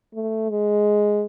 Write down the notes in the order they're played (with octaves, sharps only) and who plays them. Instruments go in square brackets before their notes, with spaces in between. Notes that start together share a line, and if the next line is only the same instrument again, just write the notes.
[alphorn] A3
G#3